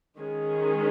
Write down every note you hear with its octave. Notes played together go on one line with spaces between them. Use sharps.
D#3 G#3 C#4 G#4